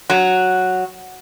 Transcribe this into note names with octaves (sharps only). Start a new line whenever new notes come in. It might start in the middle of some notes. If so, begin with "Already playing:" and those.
F#3